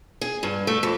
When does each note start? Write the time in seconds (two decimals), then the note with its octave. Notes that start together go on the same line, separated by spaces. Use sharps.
0.21 G#4
0.43 G2
0.67 A3
0.83 F2